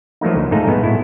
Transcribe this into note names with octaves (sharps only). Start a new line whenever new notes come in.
F3 F#3 A3 A#3 D#4
D2
G#2 A3 D#4 A4 F5
B2 G#3 A3 B3
A2 E4 F4